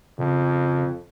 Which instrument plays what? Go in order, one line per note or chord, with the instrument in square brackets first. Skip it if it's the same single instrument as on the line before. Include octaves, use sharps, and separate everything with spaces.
[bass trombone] F2 [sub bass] C#3